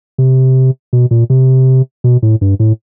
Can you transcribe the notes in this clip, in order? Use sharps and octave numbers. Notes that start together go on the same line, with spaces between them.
C3
B2
A#2
C3
B2
A2
G2
A2